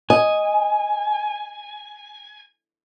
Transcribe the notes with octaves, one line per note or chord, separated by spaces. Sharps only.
D#5 G#5